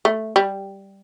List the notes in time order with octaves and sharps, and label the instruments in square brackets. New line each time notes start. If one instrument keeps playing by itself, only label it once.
[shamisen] A3
G3